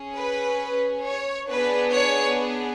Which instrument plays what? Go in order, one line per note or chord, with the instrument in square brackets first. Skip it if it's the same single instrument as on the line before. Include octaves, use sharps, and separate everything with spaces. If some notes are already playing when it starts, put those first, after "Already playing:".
Already playing: [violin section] C#4 G#4
B4
C#5
B3 D4 G#4 B4
C#5